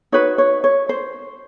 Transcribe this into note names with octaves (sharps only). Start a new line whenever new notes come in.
D#4 F#4 B4 C#5
C#5
C#5
C5